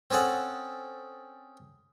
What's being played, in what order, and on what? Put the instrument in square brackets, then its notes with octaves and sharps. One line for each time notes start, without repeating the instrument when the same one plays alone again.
[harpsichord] C4 C#4 G#4 A4 F#5